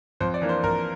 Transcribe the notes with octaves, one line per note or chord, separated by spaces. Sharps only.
F2 C5
D5
E3 A#3 D4
C5
F2 A#4